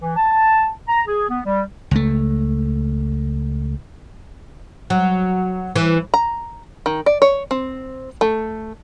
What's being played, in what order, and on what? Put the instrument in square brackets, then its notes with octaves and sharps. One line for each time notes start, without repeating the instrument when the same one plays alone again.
[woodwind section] E3
A5
A#5
G#4
B3
G3
[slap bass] C#2 A3
[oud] F#3
E3
[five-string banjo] A#5
D#3
D5
C#5
C4
A3